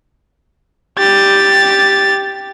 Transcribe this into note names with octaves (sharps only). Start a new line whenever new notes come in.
G4 A6